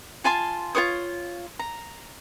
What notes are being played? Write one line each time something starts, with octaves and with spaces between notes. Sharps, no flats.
F4 G#5 A5 C6
F4 C5 C#5 D#6
A#5